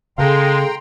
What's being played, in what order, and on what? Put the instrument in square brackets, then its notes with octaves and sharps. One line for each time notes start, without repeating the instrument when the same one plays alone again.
[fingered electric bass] C#3 [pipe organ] G#3 [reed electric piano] G#4 A4 F5 [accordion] G5 A#5 C6